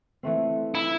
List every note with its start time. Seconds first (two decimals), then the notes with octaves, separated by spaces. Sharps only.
0.23 E3 A3 C4
0.75 E4